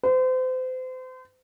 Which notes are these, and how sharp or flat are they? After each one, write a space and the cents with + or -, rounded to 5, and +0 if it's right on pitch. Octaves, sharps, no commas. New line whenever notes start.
C5 -35